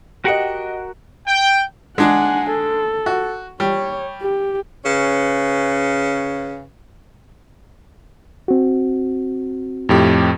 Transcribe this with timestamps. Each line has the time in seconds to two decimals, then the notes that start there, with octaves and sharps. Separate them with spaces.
0.25 F#4 G4 A#4 D#5 F#5
1.27 G5
1.98 G#3 D4 F#5 G#5
2.50 A4
3.06 F#4
3.60 G3 C#5
4.22 G4
4.85 C#3 C#4 B4
8.48 C4 F#4
9.89 F2 A2 G4